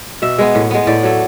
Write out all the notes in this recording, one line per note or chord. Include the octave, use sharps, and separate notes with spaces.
B2 E5
G#3 B3
A2
G#3 B3
A2 D5
F#3 A3